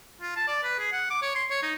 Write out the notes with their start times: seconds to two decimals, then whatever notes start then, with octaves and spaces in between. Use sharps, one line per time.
0.22 F4
0.36 A5
0.48 D5
0.63 B4
0.79 G#4
0.93 F#5
1.10 D6
1.22 C#5
1.35 C6
1.50 C#5
1.63 D#4